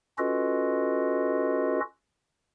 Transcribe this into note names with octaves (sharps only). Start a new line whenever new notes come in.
C#4 F4 F#4 A4 B4 D#5